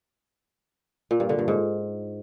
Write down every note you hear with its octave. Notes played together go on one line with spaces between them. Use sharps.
A#2
G2
D3
G2
G#2